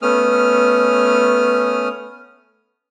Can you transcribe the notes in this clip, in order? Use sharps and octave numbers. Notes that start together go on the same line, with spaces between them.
A3 B3 C#4 D#6 F6